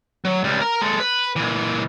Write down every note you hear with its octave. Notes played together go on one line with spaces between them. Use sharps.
F#3
C#2 G3
A#4 A#5
G#3 A4
B4
A#2 E3